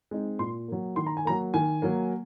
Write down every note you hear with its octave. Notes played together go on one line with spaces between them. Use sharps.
G#3 C4 D#4
A#2 C6
F#3 A#3
D#3 C6
A#5
G#5
F#3 A#3 A#5
D#3 G#5
F#3 A#3